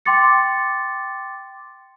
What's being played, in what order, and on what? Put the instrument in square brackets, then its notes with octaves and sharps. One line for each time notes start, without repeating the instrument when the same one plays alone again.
[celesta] G5 C6 D6 A6 C#7